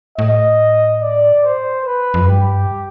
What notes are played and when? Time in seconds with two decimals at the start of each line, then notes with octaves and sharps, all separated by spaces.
0.18 A2 D#5
1.02 D5
1.44 C5
1.86 B4
2.14 F2
2.21 F#2
2.28 G2 G4